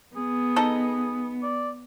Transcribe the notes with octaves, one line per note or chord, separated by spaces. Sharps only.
B3 G#4
D#4 A4 D#5
D5